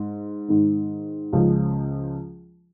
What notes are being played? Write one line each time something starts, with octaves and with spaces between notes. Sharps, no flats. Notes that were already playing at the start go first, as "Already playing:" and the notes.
Already playing: G#2
G#2 D#3
C#2 C#3 F3